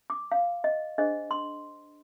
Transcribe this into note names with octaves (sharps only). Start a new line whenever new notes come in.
D6
F5
D#5
D4 G#4 C5 D#5
C6